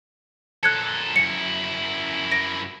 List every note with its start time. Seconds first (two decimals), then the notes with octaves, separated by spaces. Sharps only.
0.63 A#2 A4 F#6 G#6 C#7
1.16 F#2 E4 C#7
2.32 A#6 D7